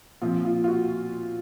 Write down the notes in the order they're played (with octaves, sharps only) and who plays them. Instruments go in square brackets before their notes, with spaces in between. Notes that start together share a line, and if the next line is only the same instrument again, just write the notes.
[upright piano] A#2 F3 C4 F4
F4
F4
F#4